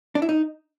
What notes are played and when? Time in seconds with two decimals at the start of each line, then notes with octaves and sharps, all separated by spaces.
0.15 D4
0.22 E4
0.29 D#4